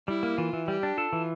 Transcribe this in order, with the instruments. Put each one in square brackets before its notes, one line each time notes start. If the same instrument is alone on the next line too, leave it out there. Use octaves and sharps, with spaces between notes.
[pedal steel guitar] G3 [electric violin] E4
[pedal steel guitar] A#3
[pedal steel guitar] E3 [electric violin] F4
[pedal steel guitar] E3
[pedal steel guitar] G3 [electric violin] G4
[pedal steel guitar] D4
[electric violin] F4 [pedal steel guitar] A4
[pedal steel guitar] E3